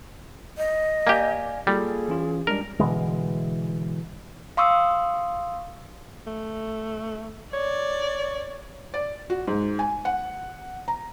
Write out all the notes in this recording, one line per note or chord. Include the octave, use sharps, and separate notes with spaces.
D#5
A#3 G4 D5 F5 G#5
G3 A#3 F4 G#4 A4
E3 C#4 F4
G3 G#3 D4 A#4
B2 D3 E3 G#3
F5 C6 C#6 D#6 E6
A3
C#5 D5
D5
F#4
G#2
G#5
F#5
A#5